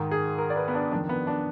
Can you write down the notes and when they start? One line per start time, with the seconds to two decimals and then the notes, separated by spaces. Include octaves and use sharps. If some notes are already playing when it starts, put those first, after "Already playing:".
Already playing: G#2 D#3
0.11 G#4
0.38 A#4
0.50 D5
0.56 B4
0.68 B3
0.74 D4
0.92 F2 D#3 D4
1.09 B3
1.27 D4